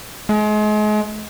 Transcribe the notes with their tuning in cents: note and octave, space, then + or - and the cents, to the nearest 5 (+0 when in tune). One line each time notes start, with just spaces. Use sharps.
G#3 +35